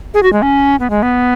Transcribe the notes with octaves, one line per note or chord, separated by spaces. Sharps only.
G#4
F#4
G#3
C#4
B3
G#3
B3